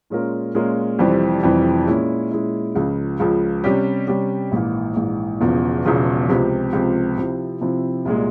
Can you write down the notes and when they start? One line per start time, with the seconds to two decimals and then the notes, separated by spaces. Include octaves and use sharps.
0.10 A#2 G#3 C#4 F4 A#4
0.55 A#2 G#3 C#4 F4 A#4
0.99 F1 F2 E3 G3 C4
1.42 F1 F2 E3 G3 C4
1.87 A#2 G#3 C#4 E4
2.31 A#2 G#3 C#4 E4
2.75 C#2 C#3 F3
3.20 C#2 C#3 F3
3.64 C3 G3 C#4 G4
4.07 C3 G3 C#4 G4
4.52 A#1 G#2 E3 A#3
4.96 A#1 G#2 E3 A#3
5.41 E1 E2 C#3 F3
5.85 E1 E2 C#3 F3
6.29 C#2 C3 F3 C4 G4
6.73 C#2 C3 F3 C4 G4
7.17 C3 F3 C4 E4
7.61 C3 F3 C4 E4
8.05 C2 A#2 G#3